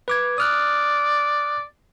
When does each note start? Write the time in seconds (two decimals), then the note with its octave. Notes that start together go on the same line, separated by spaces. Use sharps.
0.08 B4 D6 G#6
0.38 D5 D#6 F6 F#6